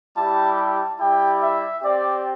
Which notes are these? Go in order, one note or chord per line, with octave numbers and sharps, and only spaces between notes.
G3 E4 G4 A5
A5
G3 E4 G4 G5
E5
C4 G4 D5